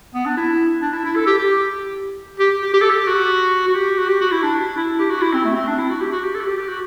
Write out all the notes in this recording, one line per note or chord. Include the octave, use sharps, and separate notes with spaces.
B3
D4
E4
D4
E4
E4
A4
G4
G4
G4
G4
G4
A4
G4
F#4
F#4
G4
F#4
G4
F#4
E4
D4
E4
G4
F#4
E4
C4
A3
C4
D4
E4
F#4
G4
F#4
G4
A4
F#4
G4
G4
F#4